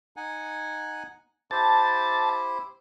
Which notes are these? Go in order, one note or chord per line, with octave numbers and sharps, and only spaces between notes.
D#4 F#5 G#5
E4 G4 C5 A5